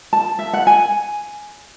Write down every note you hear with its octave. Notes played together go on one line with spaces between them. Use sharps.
A5
E5
F#5
G#5